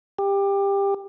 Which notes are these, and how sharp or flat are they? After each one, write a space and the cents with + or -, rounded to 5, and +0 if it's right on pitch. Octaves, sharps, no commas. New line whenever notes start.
G4 +20